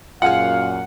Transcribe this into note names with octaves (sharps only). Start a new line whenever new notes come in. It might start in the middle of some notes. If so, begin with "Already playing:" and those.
F#2 A#2 F4 G#4 F5 F#5 F6